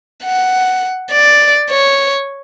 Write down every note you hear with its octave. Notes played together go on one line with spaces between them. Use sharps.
F#5
D5
C#5